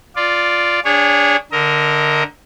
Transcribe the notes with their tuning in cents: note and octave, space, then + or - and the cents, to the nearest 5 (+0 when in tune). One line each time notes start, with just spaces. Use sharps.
F4 +0 D5 +0
D4 -25 G#4 -25 C#5 +0
D3 +0 A#4 +0 D#5 +35